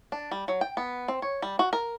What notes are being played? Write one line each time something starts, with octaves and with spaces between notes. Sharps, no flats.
D4
G3
F#3
G5
B3
C4
C#5
G3
F#4
A#4